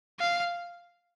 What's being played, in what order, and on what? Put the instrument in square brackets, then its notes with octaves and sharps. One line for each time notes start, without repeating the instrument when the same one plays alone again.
[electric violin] F5